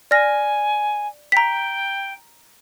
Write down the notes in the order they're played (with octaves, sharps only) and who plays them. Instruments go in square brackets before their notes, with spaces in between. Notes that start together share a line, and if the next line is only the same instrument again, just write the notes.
[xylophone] D5 F6 A#6 [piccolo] G#5
[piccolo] G5 [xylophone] A#5 B6